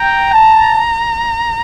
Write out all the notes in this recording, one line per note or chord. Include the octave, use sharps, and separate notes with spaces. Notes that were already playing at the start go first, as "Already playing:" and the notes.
Already playing: G5 A#5
A5